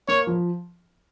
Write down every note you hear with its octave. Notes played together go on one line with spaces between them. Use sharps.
A#3 C#5
F3